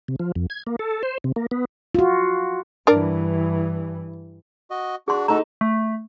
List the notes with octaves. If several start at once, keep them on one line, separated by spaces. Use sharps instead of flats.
C3
F3
F2
G#6
A#3
A4
C5
C3
A#3
B3
F4 F#4
G2 E3 D4 A#4 D5
F#4 D#5
D4 F#4 G#4 C6
A3 D#4 F#4 A4 A#5
A3